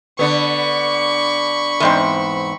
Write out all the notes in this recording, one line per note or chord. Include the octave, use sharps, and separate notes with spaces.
D3 B3 B5 C#6
E2 G#2 C4